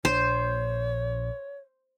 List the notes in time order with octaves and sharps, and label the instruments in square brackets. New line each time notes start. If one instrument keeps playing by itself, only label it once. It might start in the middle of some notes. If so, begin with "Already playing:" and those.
[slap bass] A#1 A#2 D4 [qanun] C5 [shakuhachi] C#5